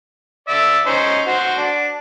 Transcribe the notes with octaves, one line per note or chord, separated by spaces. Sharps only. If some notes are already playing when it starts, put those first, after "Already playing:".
D5 E5
C#4 D#4 C5
F#4 C5
D4